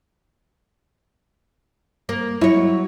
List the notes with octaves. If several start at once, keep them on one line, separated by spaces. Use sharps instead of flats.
A#3
F#3 E4 C#5